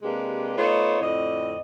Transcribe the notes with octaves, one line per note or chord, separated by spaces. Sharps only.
C3 G#3 A#3 D4 G4 B4
A3 B3 D#4 F4 C5 C#5
F2 A2 D3 C4 D5 D#5